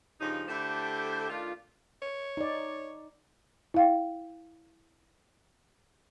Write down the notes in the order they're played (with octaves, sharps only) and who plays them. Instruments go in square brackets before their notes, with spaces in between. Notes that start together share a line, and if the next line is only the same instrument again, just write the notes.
[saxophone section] G2 C#3 F3 D#4
D3 A3 E4 G4 A4 C5
D#3 A3 D4 F4
[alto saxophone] C#5
[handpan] D#4 D5
[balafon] E4 F5 G5